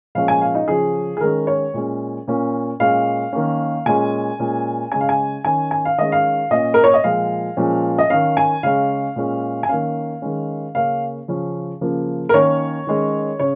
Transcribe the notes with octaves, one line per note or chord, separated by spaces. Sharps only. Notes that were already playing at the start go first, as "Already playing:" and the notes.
A#2 F3 G#3 C#4 F5
G#5
F5
D#4
C#3 F3 C#4 G#4
G#4
D#3 G#3 C#4 A#4
C#5
A#2 G#3 C#4
A#2 A#3 C#4
A#2 G#3 C#4 F5
D#3 A#3 C#4
A#2 G#3 C#4 G#5
A#2 G#3 C#4
C#3 G#3 C#4 G#5
F5
G#5
D#3 C#4 G#5
G#5
F5
D#3 G#3 C#4 D#5
F5
A#2 A#3 C#4 D#5
A#4
C#5
D#5
A#2 F3 G#3 F5
A#2 F3 G#3 C#4
D#5
D#3 C#4 F5
G#5
C#3 G#3 C#4 F5
A#2 G#3 C#4
G#5
D#3 A#3 C#4 F5
D#3 G#3 C#4
C#3 A#3 C#4 F5
C#3 F3 C#4
C#3 F3 A#3
A#4
D#3 A#3 C#4 C#5
D#3 G#3 C#4
C#3 C#5